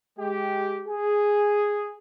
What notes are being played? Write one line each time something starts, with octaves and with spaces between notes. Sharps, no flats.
G#3 G4
G#4